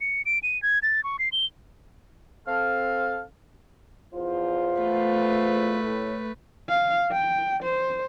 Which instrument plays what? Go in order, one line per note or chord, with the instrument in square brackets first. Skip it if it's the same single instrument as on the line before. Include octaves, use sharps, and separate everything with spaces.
[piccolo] C#7
D7
D#7
G#6
A6
C#6
C7
G7
[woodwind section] C4 A4 F5
[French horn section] E2 F4 C5
[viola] A3 B4
[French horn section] A2
[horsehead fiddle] F5
G5
C5